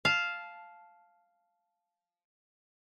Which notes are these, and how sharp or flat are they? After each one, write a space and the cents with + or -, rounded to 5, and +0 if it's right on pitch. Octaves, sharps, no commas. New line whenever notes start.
F5 +0 A5 -15